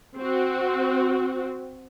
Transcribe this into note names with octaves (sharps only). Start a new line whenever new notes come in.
C4 F#4